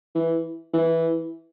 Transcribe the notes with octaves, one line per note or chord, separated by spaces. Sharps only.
E3
E3